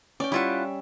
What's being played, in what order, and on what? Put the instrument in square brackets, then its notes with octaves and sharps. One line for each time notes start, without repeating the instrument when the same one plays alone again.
[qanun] C#4 G5 [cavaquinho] D5
[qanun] G3 E5 [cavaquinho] E4 F4 F#5